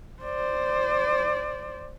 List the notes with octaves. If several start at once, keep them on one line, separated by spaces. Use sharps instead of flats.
C5 D5